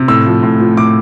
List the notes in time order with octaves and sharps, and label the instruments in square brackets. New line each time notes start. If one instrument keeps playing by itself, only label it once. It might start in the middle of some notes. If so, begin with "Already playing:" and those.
Already playing: [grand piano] C3
A2 E6
F3
A2
F3
A2 D6